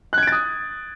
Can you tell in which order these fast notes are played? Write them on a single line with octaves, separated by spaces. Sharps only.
F#6 G#6 D7 A6 D#6